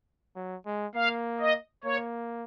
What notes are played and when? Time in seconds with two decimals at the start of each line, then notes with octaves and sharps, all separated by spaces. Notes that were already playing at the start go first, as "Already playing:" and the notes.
0.36 F#3
0.66 G#3
0.95 A#3 F5
1.40 D#5
1.84 A#3 C#5